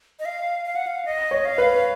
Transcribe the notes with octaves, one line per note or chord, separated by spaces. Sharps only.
D#5
F5
F5
F#5
F5
D#5
C#5
F5
B4